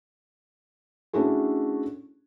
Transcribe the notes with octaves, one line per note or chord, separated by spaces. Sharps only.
A3 C#4 D4 E4 F#4 G#4